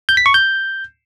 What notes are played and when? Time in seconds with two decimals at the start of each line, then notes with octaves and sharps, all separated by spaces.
0.09 G6
0.17 B6
0.26 C#6
0.34 G6